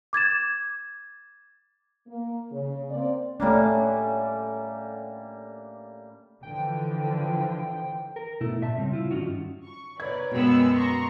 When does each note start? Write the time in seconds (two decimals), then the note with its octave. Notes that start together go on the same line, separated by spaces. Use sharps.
0.13 D6 G#6 A6 E7
2.08 A#3
2.51 C#3
2.91 A#3 C4 D5
3.40 G3 A3 A#3 C#4 D4
6.43 D3 E3 F3 G5
8.16 A#4
8.41 B2 A3 E4
8.62 A#2 E5 A5
8.77 C#3 G3 C4
8.93 E4 F4
9.11 G2 D#3 F#3 C#4 F4 F#4
9.63 C#6
10.00 A#4 B4 C#5 D5 G#6
10.32 F#2 B2 G#3 B3 G5 E6
10.73 A#5 C6 C#6